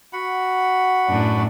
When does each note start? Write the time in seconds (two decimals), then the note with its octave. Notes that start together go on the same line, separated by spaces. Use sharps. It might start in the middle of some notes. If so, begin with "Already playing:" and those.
0.13 F#4 F#5 B5
1.07 F#2 A2 D4